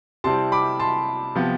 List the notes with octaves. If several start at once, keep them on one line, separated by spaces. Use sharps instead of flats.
C3 G3 C4 E4 A5 C6
B5 D6
A5 C6
C3 F3 B3